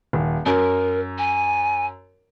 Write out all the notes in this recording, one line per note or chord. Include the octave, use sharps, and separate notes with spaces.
D#1
F#2 A#4
G#5